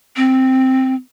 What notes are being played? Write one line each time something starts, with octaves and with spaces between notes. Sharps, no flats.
C4